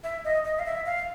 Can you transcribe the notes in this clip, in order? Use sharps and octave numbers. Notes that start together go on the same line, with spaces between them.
E5
D#5
D#5
F5
E5
F5